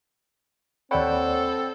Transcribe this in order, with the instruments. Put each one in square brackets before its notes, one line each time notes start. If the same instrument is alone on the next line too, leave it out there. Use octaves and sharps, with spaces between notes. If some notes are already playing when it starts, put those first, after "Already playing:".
[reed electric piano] D#2 D5 B5 [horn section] C4 A4 [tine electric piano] C#5 F#5 G5